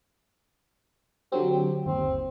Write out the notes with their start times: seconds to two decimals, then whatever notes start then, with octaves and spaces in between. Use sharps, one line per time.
1.32 D3 F#3 C4 G4
1.86 G1 D#2 C4